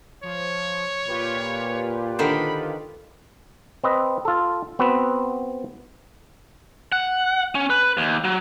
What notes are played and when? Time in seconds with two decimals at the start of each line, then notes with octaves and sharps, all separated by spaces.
0.23 F3 C#5
1.07 A#2 F4 G4 B4
2.19 D3 D#3 C5 B5
3.84 C4 B4 D#5
4.25 F4 A4
4.79 B3 C4 F#4 B4
6.92 F#5
7.55 C#4
7.70 B4
7.97 D#2
8.24 F#3